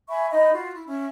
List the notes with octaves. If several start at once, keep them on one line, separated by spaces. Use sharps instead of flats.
E5 G#5 B5 C#6
D#4 D#5 B5
F4 F#4
E4
C#4 E5